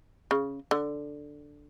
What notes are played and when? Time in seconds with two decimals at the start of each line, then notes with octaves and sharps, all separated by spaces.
0.31 C#3
0.71 D3